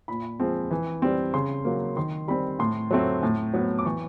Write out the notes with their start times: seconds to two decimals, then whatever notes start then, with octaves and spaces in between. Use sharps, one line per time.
0.08 A#2 B5
0.40 F3 G#3 C4
0.71 E3
1.02 G3 C4
1.34 C#3 C6
1.65 F#3 A#3
1.96 D#3 C6
2.28 G3 C4 B5
2.59 A2 C6
2.91 F#3 A3 C4
3.23 A2
3.54 F#3 B3
3.79 D6
3.85 E3 C#6